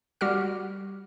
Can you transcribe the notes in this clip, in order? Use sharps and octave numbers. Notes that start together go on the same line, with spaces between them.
G3 F#4 G4 F#5 F6